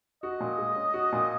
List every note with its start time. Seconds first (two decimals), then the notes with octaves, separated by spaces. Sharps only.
0.23 F#4 D#5
0.40 A#2
0.58 G#3
0.76 C#4
0.94 F#4
1.12 A#2